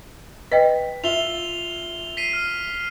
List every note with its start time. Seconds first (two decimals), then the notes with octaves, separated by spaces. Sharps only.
0.52 B4 D#5 G5 B6
1.04 F4 E5 F7 G7
2.17 B6 C7 D#7
2.33 F6